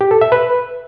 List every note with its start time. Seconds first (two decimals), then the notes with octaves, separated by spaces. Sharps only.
0.01 G4
0.11 A4
0.21 E5
0.32 B4